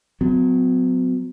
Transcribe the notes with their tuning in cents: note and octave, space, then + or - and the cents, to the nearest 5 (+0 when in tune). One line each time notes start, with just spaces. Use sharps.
F#3 -20 B3 +45